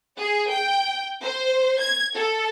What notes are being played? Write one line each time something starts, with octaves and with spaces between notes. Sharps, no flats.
G#4
G5
C5
G#6
A4